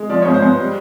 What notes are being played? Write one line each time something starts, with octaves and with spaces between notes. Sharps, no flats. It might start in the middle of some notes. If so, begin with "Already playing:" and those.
Already playing: G#3
F3 D5
C#5
G#2
C5
G#2 B4
G3